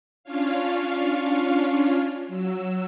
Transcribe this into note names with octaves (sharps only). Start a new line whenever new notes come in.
C#4 D4 F4 C#5 F5
F#3 E6